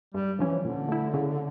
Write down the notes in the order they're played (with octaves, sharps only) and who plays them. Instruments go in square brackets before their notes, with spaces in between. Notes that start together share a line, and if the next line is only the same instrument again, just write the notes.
[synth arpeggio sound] G2 [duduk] G3
[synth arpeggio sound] D3 F3 C#4 [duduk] E3
[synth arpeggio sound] A#2 [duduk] D3
[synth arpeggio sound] A3 E4
C#3